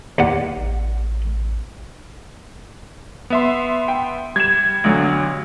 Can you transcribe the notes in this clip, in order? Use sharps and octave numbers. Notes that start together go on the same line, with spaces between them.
D#2 D5 F#5
A1
B3 E5 C6
G5
G3 G#6 E7
B1 D3 F#3